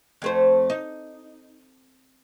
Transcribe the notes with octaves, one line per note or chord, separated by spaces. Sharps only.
F2 A3 C5
D#4